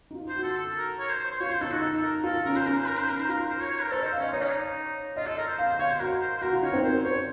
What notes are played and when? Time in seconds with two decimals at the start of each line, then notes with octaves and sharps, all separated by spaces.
0.11 D#4
0.15 F4
0.29 C5
0.36 F#4
0.43 A4
0.57 A4
0.77 A#4
0.99 C#5
1.09 C5
1.20 C5
1.30 C5
1.40 F4 C#5
1.51 C5
1.61 D#4 A4
1.72 F#4
1.82 D#4 A4
2.03 A#4
2.24 F4 A4
2.45 C#4 A#4
2.56 C5
2.66 C#4 A#4
2.77 C5
2.88 A#4
2.99 C5
3.08 D#4 A#4
3.20 C5
3.29 F4 A#4
3.50 C5
3.60 C#5
3.70 C#5
3.81 A#4
3.91 A4 C5
4.02 D#5
4.05 C5
4.12 F5
4.19 C#4 D#5
4.32 D#4 C#5
4.42 C#4
4.52 D#4
5.16 F4 D#5
5.27 A4
5.38 A#4
5.48 C5
5.58 C5 F5
5.69 C5
5.79 C#5 F5
5.90 C5
6.00 F#4 A#4
6.21 C5
6.38 C5
6.42 F#4 A#4
6.53 F4
6.62 D#4 C#5
6.73 C4
6.83 A#4 C5
7.04 C5 C#5